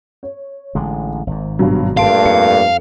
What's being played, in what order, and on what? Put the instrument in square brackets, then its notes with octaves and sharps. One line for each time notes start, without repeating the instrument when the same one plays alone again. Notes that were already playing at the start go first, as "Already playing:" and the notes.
[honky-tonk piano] C#5
[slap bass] A1 D3 G#3
G#1 G#2
[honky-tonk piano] G2 B2 F#3
[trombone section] G2 A#2 A3 [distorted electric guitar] F5 [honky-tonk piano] A5 C6 D7
[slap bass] F2 [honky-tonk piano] A5 C#7